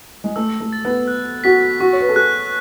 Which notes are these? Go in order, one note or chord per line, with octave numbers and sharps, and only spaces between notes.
G#3
A3 E6
A3
A6
B3
F#6
F#4 B6
F#4 C#6
C#5
B4
A4
G#4 F#6